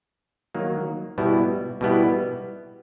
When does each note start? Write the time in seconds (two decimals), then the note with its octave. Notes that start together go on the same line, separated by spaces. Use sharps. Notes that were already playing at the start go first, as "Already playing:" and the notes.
0.55 D#3 F#3 A#3
1.18 B2 G3 B3 E4
1.81 B2 G3 B3 E4